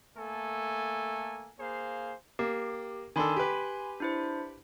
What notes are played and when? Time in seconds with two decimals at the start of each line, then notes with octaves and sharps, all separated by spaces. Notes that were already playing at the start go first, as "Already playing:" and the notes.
0.17 A3 A#3 A4 G#5
1.60 A#3 G#4 C5 F5
2.39 A#3 G4
3.16 D#3 D4 A4 G#5 B5 C6
3.36 G4 B4
4.00 D4 E4 C5